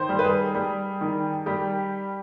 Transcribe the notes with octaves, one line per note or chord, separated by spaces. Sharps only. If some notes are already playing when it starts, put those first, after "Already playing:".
Already playing: D#3 C5
G3
B4
G#4
G3
D#3
G3 G4